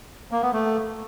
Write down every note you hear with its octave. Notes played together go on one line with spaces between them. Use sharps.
A#3
B3
A3